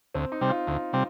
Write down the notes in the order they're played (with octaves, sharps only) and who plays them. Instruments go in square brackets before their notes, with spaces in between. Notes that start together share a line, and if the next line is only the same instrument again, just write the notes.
[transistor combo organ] D2 [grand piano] C4
[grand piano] D#4
[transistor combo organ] C3 G3 C4
[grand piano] F4
[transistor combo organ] D2
C3 G3 C4